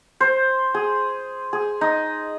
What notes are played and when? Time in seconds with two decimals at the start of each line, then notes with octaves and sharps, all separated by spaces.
0.20 C5
0.74 G#4
1.53 G#4
1.81 D#4